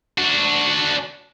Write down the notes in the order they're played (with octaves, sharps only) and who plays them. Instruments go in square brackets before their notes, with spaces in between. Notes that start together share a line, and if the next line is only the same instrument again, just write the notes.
[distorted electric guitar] D4 F#4